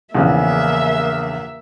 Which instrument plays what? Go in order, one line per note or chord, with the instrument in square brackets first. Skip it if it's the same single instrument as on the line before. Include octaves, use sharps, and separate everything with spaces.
[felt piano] A#1 E2 C#3 [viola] A#3 E5